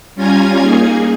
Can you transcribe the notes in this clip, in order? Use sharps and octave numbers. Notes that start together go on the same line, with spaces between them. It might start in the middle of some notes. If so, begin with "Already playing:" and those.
G3 C#4 F4 G#5 A#5 G#6
A#3 D#4 G#4